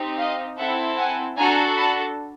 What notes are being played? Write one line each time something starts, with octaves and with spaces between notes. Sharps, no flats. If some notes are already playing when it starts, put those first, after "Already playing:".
Already playing: C4 D#4 G4
D#5 F5
C4 E4 A4 E5 F#5
F#5 G#5
D4 F#4 A4 G#5 A#5
A5 B5